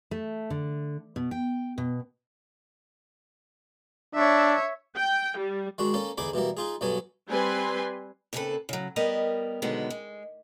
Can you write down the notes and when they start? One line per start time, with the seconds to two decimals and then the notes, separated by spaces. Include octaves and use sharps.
0.11 A3
0.50 D3
1.16 B2
1.31 G5
1.78 B2
4.15 D4 C#5 E5
4.96 G5
5.38 G3
5.78 D#3 G#3 D4 F#4
5.94 A#3 C#4 A4
6.18 E2 D3 D#4 G#4 B5 D6
6.34 B2 E3 G3 A#3
6.57 D#4 F4 G#4
6.81 B1 G2 F#3 B3 A4 G#5
7.29 G3 C4 B4 G#5 C6
8.33 D#2 C#3 C4 F#4 A4 B4
8.69 C#3 F#3
8.96 G3 B3 A#4 D#5
9.62 B2 D3 D#3 F#3 G#3 B3
9.90 G#3